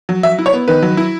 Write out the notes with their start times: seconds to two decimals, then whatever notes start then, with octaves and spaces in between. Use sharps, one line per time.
0.09 F#3
0.23 F#3 E5
0.39 E4
0.46 C#5
0.53 B3
0.68 D#3 B4
0.83 F#3
0.97 E4